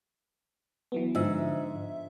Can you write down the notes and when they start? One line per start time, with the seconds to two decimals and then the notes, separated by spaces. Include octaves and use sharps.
0.92 E3 F#3 B3
1.15 G#2 D3 F3 E5